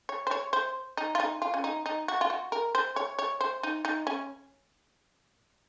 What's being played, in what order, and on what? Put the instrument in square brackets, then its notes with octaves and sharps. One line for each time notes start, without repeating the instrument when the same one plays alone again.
[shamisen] C#5
C5
C#5
C5
D#4
F4
D#4
F4
C#4
D#4
D#4
F#4
F4
F#4
A#4
C5
C#5
C#5
C5
D#4
D#4
C#4